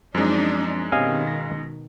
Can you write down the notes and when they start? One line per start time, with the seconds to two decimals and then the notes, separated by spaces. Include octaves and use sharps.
0.15 F#2 F3 G#3 C4 D4 D#4
0.92 B2 D#3 C4 C#4 G4 D#5 F5 G#5
1.27 A#6